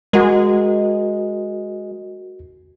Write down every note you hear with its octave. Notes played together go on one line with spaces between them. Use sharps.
G#3 F#4 A#4